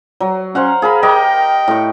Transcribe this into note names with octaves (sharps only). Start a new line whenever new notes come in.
F#3
C#4 C5 F5 F#5
G#4 A#4 F5 B5
G4 A#4 D#5 G5
A2 C#6